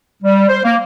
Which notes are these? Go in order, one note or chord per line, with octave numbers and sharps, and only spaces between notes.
G3
C5
A#3